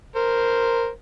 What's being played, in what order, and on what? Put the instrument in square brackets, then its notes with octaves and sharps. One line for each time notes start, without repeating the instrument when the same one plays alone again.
[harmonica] A#4 C5